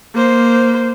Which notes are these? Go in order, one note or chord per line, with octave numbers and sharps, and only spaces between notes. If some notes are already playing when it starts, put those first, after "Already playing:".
A#3 C5